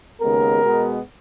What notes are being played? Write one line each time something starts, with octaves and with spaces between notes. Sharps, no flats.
D#2 C#3 G#3 B3 A#4
B2 G#3 B3